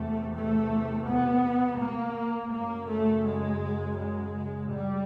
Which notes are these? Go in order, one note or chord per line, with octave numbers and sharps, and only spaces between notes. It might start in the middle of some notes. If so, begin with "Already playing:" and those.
Already playing: E2 C3 A3
A3
B3
A#3
F#2 C#3 A#3
A3
G#3
G#3
G3